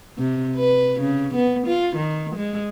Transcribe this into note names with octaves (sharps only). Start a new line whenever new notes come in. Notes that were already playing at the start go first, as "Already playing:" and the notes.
C3
B4
C#3
B3
F4
D#3
G#3